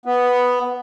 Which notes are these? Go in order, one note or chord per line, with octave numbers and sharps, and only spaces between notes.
B3